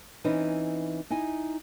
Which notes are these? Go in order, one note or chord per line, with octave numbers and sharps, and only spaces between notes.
E3 C4 C#4 D#4 B4
D#4 E4 G#5